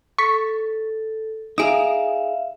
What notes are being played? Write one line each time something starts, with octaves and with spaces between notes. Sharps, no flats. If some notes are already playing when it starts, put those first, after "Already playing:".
A4 C#6 B6
D#4 G#4 E5 F5 D#6 D7